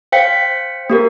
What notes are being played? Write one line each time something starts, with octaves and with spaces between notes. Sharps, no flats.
C5 F5 G5 B6 C#7
A#3 G4 A#4